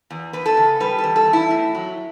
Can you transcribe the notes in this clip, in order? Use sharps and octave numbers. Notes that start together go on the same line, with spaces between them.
E2
E2 B4
A4
C#3
G3 B4
A4
E2
A4
E2
E4
A2
F#3